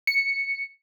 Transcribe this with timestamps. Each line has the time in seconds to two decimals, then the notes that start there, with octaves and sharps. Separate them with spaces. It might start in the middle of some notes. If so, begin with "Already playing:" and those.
0.07 C#7